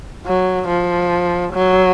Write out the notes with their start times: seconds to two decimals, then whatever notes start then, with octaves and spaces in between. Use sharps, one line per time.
0.26 F#3
0.68 F3
1.53 F#3